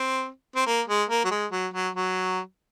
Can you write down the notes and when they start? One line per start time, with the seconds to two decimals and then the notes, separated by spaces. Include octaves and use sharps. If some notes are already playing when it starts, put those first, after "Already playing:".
Already playing: C4
0.56 C4
0.66 A#3
0.88 G#3
1.09 A#3
1.25 F#3
1.31 G#3
1.52 F#3
1.74 F#3
1.95 F#3